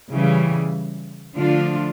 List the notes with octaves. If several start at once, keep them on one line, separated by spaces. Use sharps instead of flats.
C#3 E3 G3
D3 F3 A3 D4 F4